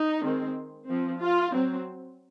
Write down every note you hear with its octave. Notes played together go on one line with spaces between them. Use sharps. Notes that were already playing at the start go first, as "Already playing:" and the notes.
Already playing: D#4
D#3 G#3 C4
F3 C4
F4
F#3 C4